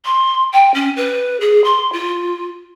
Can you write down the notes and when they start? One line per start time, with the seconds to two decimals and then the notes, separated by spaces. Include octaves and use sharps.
0.05 C6
0.52 G5
0.74 C#4
0.96 B4
1.40 G#4
1.64 C6
1.92 F4